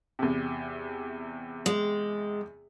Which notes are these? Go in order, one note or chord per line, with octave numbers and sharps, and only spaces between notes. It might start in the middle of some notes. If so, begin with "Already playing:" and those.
E2 C3
G#3